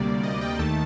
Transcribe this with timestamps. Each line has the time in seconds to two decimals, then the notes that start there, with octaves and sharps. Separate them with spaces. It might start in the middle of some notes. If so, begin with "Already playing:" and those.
Already playing: D2 C3 G3 A#3 D5
0.23 D#5
0.41 G5
0.59 D#2 D#3 A3 A5